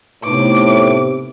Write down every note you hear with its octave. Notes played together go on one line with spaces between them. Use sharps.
A2 C3 B3 D#4 B4 D6